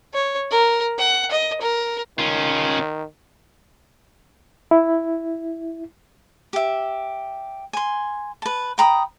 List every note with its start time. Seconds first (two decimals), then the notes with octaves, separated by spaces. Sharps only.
0.14 C#5
0.51 A#4
0.98 F#5
1.31 D#5
1.61 A#4
2.19 D#3 C#4 F4
4.71 E4
6.53 G4 E5
7.73 G#5 C6
8.42 B4 A5
8.78 G5 A#5 B5 D#6